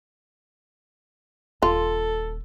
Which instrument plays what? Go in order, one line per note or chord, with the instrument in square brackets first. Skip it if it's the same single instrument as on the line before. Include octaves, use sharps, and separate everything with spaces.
[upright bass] D#1 [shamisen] F4 [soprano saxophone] A4